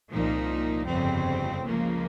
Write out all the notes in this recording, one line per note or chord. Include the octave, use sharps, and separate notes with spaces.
C2 A#2 F3 A#3 D#4
G1 F2 C#3 G3 C4
C#2 C#3 F3 A#3